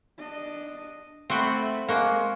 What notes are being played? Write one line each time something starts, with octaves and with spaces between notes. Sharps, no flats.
D4 D#5
A3 C4 F#4 G5 B5
G#3 A#3 F#4